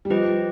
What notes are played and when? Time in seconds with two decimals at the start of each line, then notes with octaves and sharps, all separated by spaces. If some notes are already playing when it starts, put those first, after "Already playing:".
0.05 G3
0.10 F3 G4 B4 D#5 G5